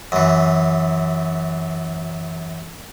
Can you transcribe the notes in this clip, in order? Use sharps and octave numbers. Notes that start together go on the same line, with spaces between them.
F#2 E3